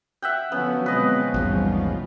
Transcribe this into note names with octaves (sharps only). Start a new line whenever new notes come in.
E5 F#5 G5
D3 F3 F#3 B3 C#4
B2 G#3 C4 B4 D#5
A#1 E2 G#2 C3 G3 F4